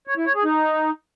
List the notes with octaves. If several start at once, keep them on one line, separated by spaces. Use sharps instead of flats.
C#5
E4
C#5
G#4
D#4